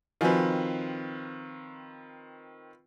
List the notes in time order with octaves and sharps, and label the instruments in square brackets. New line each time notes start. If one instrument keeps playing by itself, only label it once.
[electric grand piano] D#3 C4 [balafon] F3 F#4 G#5 [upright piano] F4 B4